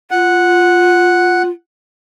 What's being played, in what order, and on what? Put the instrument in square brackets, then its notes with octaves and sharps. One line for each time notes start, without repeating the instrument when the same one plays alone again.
[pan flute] F4 [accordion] F#5